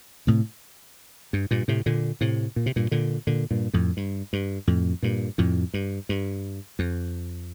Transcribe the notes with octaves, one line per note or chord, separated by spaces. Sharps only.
A2 C3
G2
G2 A#2
A2 C3
A#2 D3
A2 C3
A#2
C3
G2 A#2
A#2 D3
A#2 D3
G2 A#2
F2 A2
G2
G2
F2 A2
G2 A#2
F2 A2
G2
G2
F2